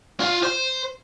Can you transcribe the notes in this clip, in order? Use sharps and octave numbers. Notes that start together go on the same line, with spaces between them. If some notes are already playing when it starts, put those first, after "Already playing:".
F4
C5